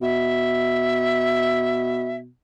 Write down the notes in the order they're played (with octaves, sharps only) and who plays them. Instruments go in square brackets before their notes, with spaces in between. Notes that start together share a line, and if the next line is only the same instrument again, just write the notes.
[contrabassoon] B2 [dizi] E5